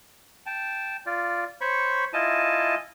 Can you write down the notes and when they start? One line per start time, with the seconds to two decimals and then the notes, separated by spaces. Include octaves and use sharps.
0.46 G5 A5
1.06 F4 D5
1.61 C5 C#5 B5 C#6
2.13 E4 F4 D#5 G#5 A5